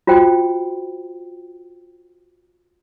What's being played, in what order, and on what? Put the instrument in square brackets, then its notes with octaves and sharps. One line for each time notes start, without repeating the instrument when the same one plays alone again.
[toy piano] F4 F#4 C5 G5